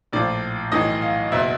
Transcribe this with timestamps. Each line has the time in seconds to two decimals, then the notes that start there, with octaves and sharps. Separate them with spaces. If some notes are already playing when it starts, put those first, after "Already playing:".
0.13 A#1 A2 F3 D5
0.72 B1 A2 E3 D#5
1.02 F5
1.31 F#1 B2 E5